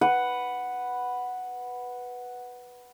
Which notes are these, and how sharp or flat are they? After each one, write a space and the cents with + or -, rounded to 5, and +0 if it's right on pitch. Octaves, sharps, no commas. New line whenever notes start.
B4 +0 F#5 +0